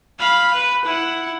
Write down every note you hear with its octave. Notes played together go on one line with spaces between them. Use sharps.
F5 B5
B4
E4 F#5